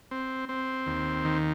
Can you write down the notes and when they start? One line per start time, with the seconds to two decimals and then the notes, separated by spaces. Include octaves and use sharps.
0.11 C4
0.49 C4
0.86 D#2
1.25 D#3